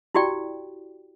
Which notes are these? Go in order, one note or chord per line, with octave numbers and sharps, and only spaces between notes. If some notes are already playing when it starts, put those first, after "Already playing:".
E4 F#4 G4 D5 G5